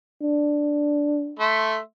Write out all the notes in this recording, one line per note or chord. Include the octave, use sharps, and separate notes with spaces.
D4
A3 E5 C6